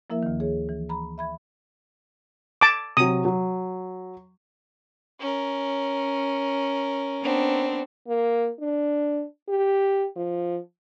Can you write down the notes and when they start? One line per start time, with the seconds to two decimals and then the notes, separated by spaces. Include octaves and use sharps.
0.10 F3 A#3 E4 A#4 E5
0.23 D2 D#3
0.40 G#4 C#5
0.69 E3
0.89 A#5 B5
1.18 E5 B5 G#6
2.61 A5 D6
2.97 C3 F#3 D#6
3.25 F#3
5.20 C#4 A#4
7.22 B3 C4 D4
8.08 A#3
8.61 D4
9.49 G4
10.16 F3